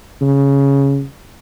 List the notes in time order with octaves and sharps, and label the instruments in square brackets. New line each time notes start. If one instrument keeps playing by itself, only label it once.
[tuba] C#3